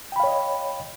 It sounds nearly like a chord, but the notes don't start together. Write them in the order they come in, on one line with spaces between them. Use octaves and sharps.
G5 B5 F5 C#5 D#5